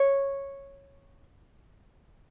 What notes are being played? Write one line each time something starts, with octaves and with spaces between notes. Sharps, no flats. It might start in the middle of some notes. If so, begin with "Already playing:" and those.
Already playing: C#5